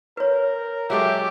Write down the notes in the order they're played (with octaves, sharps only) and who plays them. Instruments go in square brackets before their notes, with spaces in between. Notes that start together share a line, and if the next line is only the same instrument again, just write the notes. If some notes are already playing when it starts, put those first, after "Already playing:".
[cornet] A#4 [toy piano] B4 C#5
[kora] F#3 G#3 A4 [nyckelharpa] G4 [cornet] E5